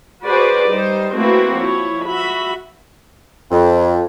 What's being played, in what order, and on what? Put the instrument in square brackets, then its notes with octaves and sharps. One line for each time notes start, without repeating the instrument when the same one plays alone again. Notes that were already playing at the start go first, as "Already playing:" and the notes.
[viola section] F#4 G#4 B4 C5 D5
G3 D#4 C5
A3 A#3 C4 E4 F#4 B4
F3 E4 C#5
F#4 E5 B5
[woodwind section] F2